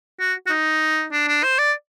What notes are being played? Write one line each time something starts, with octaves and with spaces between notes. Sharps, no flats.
F#4
F#4
D#4
D4
D4
C5
D5